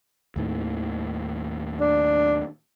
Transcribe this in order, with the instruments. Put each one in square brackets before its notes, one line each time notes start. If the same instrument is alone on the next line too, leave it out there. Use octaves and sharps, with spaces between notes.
[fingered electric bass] D#2 A2 D#3
[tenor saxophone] D4